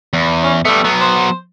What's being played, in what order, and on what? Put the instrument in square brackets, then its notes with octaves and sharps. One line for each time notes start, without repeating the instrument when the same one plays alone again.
[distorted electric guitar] E2
[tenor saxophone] C#4
[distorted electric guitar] G3 B3 [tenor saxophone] A3
[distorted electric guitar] F#3 B3
[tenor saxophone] C5